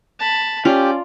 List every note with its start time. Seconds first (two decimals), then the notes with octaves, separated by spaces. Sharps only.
0.19 A5 B5
0.65 C#4 F4 G4 D5